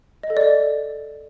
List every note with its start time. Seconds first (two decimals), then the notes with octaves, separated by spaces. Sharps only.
0.23 D#5
0.30 A4
0.37 D5